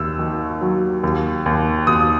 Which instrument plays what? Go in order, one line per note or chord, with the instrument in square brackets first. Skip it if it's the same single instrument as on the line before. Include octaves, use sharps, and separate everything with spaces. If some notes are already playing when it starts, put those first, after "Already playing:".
Already playing: [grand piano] D#2 E6
D#3
F#3
D#2
D#2
D#2 D#6